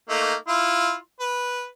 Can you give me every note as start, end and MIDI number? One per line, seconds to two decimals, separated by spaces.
0.09 0.34 57
0.09 0.34 58
0.09 0.34 63
0.48 0.95 64
0.48 0.95 65
1.20 1.67 71